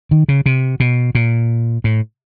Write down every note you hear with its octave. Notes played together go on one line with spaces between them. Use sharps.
D#3
C#3
C3
B2
A#2
A2